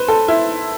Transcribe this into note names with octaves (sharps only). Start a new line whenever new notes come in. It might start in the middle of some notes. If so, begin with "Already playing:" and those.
Already playing: B4 C5
A4
E4